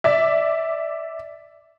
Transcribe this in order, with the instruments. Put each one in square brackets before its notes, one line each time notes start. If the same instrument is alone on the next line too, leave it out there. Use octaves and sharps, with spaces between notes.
[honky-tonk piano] D5 E5